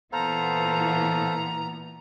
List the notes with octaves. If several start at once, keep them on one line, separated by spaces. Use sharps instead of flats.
A#2 E3 B3 A4 C5 F5 A#5